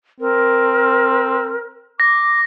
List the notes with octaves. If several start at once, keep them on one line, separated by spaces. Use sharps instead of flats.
C4 A#4
D6 A#6